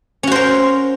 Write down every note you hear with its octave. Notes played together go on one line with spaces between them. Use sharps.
C#4 F#4 A#4 C5